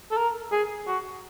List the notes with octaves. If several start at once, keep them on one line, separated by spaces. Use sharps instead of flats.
A4
A#4
G#4
F#4